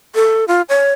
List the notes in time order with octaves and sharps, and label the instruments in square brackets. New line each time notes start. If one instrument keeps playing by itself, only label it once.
[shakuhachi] A4
F4
C#5